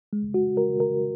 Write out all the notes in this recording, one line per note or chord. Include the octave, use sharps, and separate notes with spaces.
G#3
F#4
A#4
A#4